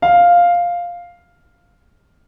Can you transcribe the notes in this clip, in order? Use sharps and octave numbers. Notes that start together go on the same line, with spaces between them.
F5